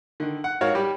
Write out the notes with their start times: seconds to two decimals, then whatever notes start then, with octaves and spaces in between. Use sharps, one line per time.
0.20 D3 D#3
0.44 F#5
0.61 G#2 F#4 A#4 C#5 F5
0.75 G3 G4